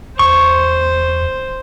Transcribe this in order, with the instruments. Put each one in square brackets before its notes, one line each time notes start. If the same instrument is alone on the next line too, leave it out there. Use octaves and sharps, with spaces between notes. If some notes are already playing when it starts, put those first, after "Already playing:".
[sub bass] E2 [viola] C5 [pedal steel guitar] C#6